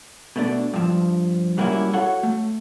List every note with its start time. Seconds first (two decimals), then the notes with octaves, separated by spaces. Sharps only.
0.36 B2 A3 D4
0.74 G2 F3
1.57 G#2 F#3 G3 A#3 C#4 E4
1.93 F#4 A4 C#5 F5 F#5
2.23 A3